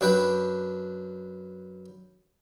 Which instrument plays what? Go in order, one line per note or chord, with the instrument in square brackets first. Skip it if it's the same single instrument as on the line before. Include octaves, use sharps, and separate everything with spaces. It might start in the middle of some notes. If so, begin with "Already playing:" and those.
[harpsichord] F#2 D4 B4 G5 B5